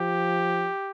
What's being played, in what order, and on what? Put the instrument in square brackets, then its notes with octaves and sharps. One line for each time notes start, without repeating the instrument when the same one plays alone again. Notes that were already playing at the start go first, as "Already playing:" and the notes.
Already playing: [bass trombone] F3 [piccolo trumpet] G4